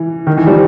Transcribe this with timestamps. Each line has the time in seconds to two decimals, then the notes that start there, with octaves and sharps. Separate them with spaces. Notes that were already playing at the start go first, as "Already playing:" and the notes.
Already playing: E3
0.27 D#3
0.37 E3
0.47 F3 G3